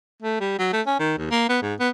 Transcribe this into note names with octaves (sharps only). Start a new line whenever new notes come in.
A3
G3
F#3
A3
C#4
D#3
D#2
A#3
B3
G#2
B3